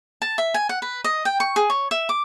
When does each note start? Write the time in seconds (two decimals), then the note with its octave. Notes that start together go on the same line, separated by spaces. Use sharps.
0.22 A5
0.38 E5
0.54 G#5
0.69 F#5
0.82 B4
1.04 D#5
1.25 G5
1.40 C#6
1.56 G#4
1.70 C#5
1.91 E5
2.09 D6